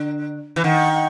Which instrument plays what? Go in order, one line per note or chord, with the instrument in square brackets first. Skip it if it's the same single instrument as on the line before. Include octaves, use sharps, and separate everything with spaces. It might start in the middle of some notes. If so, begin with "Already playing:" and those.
Already playing: [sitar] D3
E3
[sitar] D#3 [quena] F#5
[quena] F#5